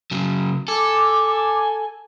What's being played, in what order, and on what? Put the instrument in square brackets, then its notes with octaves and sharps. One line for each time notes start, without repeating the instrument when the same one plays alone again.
[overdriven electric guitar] C#3 F#3
[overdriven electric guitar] A4 [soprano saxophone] G#5 [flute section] D6